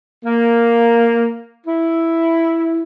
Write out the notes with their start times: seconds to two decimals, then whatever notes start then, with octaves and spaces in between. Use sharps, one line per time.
0.24 A#3
1.65 E4